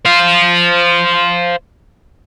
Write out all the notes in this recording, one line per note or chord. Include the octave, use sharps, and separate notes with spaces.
C5 F5